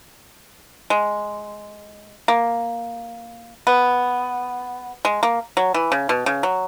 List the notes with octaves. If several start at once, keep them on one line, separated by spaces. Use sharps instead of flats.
G#3
A#3
B3
G#3
A#3
F#3
E3
C#3
B2
C#3
F#3